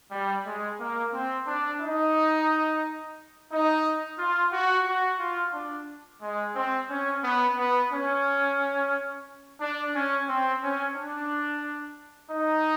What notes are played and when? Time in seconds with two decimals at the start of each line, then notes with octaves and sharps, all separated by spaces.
0.11 G3
0.46 G#3
0.79 A#3
1.14 C4
1.47 D4
1.81 D#4
3.51 D#4
4.18 F4
4.53 F#4
4.86 F#4
5.20 F4
5.54 D4
6.22 G#3
6.55 C4
6.90 C#4
7.23 B3
7.58 B3
7.91 C#4
9.60 D4
9.94 C#4
10.29 C4
10.63 C#4
10.96 D4
12.31 D#4